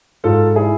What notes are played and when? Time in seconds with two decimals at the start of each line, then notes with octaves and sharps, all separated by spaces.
0.24 G#2 F4 A4
0.55 E4 G#4